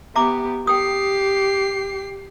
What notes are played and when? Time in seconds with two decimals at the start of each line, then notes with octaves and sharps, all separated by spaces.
0.16 B3 G4 E5 A#5 D6
0.67 G4 G5 D#6 C7